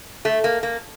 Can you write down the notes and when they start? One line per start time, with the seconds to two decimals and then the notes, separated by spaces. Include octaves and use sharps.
0.25 A3
0.44 A#3
0.63 A#3